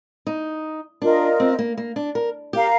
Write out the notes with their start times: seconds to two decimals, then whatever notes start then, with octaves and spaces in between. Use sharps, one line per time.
0.27 D#4
1.02 D4 F4 A#4 D#5
1.40 C4
1.59 A#3
1.78 A#3
1.96 D4
2.15 A#4
2.53 G4 A#4 F5 A#5